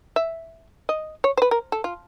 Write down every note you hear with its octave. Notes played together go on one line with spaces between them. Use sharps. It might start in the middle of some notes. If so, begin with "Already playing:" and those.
E5
D#5
C#5
C5
B4
A#4
A4
F4